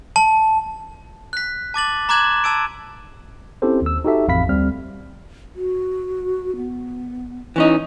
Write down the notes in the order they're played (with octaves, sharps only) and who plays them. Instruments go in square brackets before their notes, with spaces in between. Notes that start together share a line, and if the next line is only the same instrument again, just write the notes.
[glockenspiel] A5
F#6 B6
A5 D6 A6 F#7
A#5 C6 D6 F#6 G#6 E7
A5 E6 D7
[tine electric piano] C4 C#4 E4 G4 A4 C5
D#2 E6
D#4 F#4 G4 A4 E5
A1 F2 F5 B5 B6
D2 G3 C4 F6
[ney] F#4
B3
[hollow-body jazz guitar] E3 C#4 D#4 [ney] E4